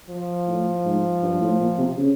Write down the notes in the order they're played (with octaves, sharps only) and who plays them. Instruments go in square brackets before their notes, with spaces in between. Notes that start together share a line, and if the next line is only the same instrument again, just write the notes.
[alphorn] F3
[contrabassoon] A2
G#2
G2
A2
A#2
C3
C#3